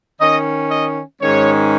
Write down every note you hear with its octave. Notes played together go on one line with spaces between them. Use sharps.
D#3 C#4 D#5
D#5
G#2 D#3 G#3 C#4 C#5